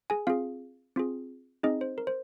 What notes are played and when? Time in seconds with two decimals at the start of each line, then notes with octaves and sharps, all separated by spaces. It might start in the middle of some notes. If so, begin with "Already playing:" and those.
0.10 G#4 G#5
0.27 C4 F4 G#4 F5
0.96 C4 F4 G#4
1.63 C4 D#4 G#4 D#5
1.81 C5
1.98 A#4
2.07 C5